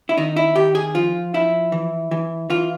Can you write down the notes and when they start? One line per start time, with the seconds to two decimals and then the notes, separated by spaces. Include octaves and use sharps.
0.09 E4
0.17 D#3 D#4
0.36 E4
0.56 D#3 G4
0.75 G#4
0.95 F3 F4
1.34 F3 E4
1.72 E3
2.11 E3
2.50 E3 F4